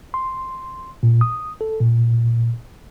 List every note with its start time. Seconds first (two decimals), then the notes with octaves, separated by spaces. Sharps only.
0.14 C6
1.03 A#2
1.21 D#6
1.61 A4
1.80 A#2